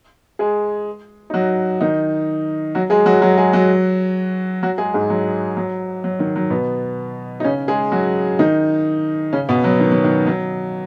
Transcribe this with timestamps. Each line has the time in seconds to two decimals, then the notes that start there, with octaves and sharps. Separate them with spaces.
0.39 G#3 G#4
1.30 D#4
1.34 F#3 F#4
1.81 D#3 D#4
2.75 F#3 F#4
2.90 G#3 G#4
3.06 F#3 F#4
3.22 F#3 F#4
3.38 G#3 G#4
3.53 F#3 F#4
4.63 F#3 F#4
4.78 G#3 G#4
4.94 G#2 G#3
5.10 F#3
5.57 F#3
6.04 F#3
6.19 D#3
6.36 F#3
6.50 B2 B3
7.40 D#4
7.44 C#3 C#4
7.68 G#3 G#4
7.92 F#3 F#4
8.39 D#3 D#4
9.33 C#3 C#4
9.49 B2 B3
9.64 F#3
9.80 D#3
9.92 F#3
10.04 D#3
10.27 F#3